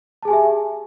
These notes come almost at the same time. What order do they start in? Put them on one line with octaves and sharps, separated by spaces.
A5 G#4 G#5 G4 E5